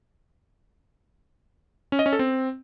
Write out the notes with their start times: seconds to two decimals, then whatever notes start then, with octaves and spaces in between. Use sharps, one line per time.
1.92 C#4
1.99 D#5
2.06 C#4
2.13 A4
2.19 C4